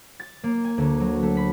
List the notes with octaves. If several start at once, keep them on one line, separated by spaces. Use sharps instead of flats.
A6
A#3
G#5
D2
F#3
A3
B5